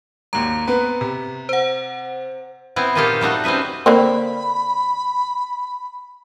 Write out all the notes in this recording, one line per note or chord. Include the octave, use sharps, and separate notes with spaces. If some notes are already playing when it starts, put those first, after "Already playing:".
G#1 D#2 A#5
B3 C4 B4
C3
C5 F#5
B3 C4 E4
A#2 A#3 D#4 F4 G4 A4
G3 A3 D#4 F#4
C4 C#4 D#4 B4 E5
D3 A#3 C4 B5